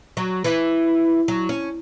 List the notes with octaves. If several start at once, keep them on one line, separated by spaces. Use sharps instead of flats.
F#3
E3
F#3
C#4